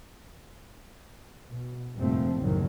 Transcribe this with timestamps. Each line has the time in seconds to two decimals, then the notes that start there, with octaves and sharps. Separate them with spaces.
1.50 B2
1.97 F1 A#1 G2 F3 A3 C4
2.37 F#1 C2 A2 D#3 F#3